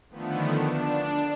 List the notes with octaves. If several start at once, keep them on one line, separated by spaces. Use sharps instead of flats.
D3 D#3 F3 A3 B3
D4 E7